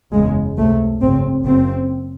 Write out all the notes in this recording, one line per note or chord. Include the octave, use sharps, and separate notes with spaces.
F#1 E2 C#3 G#3
C#2 C3 A3
G#1 F#2 C#3 C4
F#1 F#2 C#3 C4